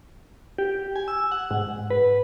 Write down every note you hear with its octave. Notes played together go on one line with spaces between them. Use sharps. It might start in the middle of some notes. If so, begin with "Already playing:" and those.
G4
G#5
E6
F#5
G#2
B4